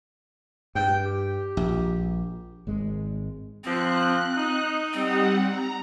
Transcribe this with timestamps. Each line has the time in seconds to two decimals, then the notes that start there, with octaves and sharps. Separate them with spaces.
0.75 G2 G5
1.04 G4
1.57 A#1
2.67 G#1 G#3
3.64 D3 F3 C4 F#6
4.35 D#4
4.93 G3 C4 F#5
5.49 A#5